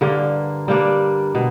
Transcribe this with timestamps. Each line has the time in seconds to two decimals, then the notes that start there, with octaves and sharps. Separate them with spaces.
0.01 G2 D3 A#3
0.68 G3 A#3 D4
1.35 B2